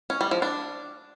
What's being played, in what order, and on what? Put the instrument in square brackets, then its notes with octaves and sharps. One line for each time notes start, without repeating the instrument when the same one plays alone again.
[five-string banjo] C#4
G3
F3
D4